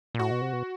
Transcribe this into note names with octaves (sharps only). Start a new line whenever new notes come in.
A#2
A2 F#4
B2
C3
B2